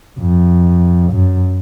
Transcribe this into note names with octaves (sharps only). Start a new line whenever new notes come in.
F2
F#2